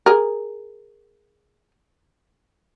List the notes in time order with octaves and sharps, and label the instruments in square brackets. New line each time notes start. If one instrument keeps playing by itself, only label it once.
[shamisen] G#4 A#4